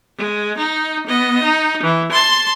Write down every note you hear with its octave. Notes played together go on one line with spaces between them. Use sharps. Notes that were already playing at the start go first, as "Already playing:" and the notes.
G#3
D#4
B3 D#5
D#4
E3
A5 C6